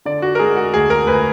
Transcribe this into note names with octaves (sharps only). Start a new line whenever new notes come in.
D3 D5
F#4
A#4
G#3 G#4
F#4
D2 G#4
A#4
D2 B4